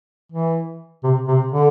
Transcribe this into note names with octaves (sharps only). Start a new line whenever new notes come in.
E3
C3
C3
D3